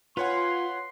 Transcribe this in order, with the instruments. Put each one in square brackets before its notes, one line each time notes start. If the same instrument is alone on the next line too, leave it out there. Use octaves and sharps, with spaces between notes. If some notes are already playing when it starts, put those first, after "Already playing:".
[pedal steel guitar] F4 G#5 [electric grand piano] B4 C#5 F#5 [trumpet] C6